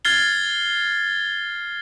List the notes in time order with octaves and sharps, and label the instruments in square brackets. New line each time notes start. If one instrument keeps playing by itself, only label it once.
[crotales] F6 G#6 A6 C7 G7